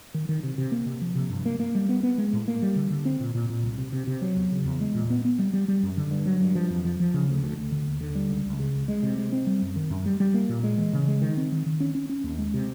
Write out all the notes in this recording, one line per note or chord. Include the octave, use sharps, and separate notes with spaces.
D#3
D#3
C3
C3
A#3
C3
F3
C3
G2
A#3
A#3
G3
B3
B3
G#3
A2
A#3
G3
D3
D3
C4
A#2
A#2
A#2
C2
C3
C3
C3
F#3
E2
C#3
E2
G#3
A#2
B3
B3
G3
G3
G3
F#2
D3
G2
F#3
G2
F3
F2
F3
F3
C#3
D2
D2
D2
D3
D#2
D3
G3
C#2
C#2
C#3
C#2
G#3
C3
G#3
C4
G3
F#2
D#3
F#2
G3
G3
A#3
A#2
G#3
E3
C#3
G#3
D#3
C4
D#3
D#3
C#4
C#4
C#4
D#2
G#3
C3